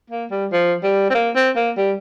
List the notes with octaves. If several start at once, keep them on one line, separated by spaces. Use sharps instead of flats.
A#3
G3
F3
G3
C4
A#3
C4
A#3
G3